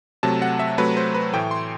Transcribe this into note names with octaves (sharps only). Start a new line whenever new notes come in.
C3 F#3 A3 A5
F#5
E5
C3 F#3 A3 B4
C5
B4
A2 E3 A3 G5
C6